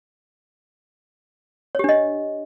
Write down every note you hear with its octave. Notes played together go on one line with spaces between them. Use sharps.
D4 G4 C#5 D#5